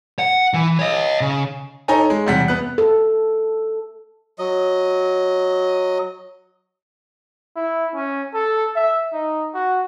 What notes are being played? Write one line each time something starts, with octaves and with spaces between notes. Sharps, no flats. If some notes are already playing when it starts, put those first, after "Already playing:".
F#5
E3
C#5 D#5
C#3
D#4 A4 C#5 G#5 A#5
G#3
E2 C3 G3 F#5 B6
B3 F#6
A4
F#3 D#5
E4
C#4
A4
E5
D#4
F#4